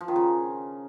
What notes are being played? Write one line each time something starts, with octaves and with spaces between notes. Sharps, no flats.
F3
D#3
C#3